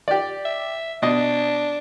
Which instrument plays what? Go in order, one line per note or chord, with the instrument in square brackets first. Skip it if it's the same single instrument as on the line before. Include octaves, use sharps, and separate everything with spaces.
[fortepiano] G4 D5
[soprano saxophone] E5
[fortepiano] B2 D#5 [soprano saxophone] D4